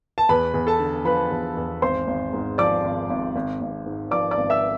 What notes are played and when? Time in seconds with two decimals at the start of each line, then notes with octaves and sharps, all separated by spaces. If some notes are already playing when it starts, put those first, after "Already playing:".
0.18 A5
0.29 E2 B4 B5
0.54 E2
0.67 A4 A5
0.80 D3
1.05 F3 B4 B5
1.31 E2
1.57 E2
1.82 G#1 C5 C6
2.07 G#1
2.33 G#2
2.58 F3 D5 D6
2.84 G#1
3.10 G#1
3.36 G#1
3.61 G#1
3.86 G#2
4.11 F3 D5 D6
4.31 D5 D6
4.37 G#1
4.50 E5 E6